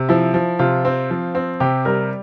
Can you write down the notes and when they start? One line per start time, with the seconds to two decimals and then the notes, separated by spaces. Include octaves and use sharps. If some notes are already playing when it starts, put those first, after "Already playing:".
Already playing: C3
0.09 F3 E4
0.34 F3
0.59 C3 F4
0.85 C4
1.10 F3
1.35 C4
1.60 C3 G4
1.85 G3 A#4